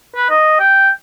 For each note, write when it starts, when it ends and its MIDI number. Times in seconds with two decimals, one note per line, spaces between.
0.16 0.28 71
0.30 0.56 75
0.60 0.89 79